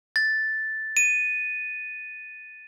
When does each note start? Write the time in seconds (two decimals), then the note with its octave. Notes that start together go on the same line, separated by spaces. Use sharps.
0.16 A6
0.97 D#7